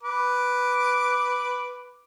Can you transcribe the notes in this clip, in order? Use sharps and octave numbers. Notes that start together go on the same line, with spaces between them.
B4 D6